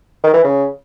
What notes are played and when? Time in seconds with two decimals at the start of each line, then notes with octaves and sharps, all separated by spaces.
0.24 D#3
0.34 E3
0.44 C#3